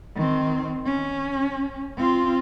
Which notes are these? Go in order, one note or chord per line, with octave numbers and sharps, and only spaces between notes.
D#3 C4
C#4
C4 F4